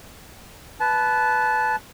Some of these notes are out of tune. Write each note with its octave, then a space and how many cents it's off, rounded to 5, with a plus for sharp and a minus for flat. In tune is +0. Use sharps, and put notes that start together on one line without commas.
B4 +0 A5 -20